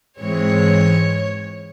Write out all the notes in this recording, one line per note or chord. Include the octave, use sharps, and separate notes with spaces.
G#2 E3 G#3 C4 C#5